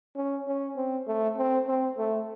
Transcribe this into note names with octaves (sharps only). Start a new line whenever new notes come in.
C#4
C#4
C4
A3
C4
C4
A3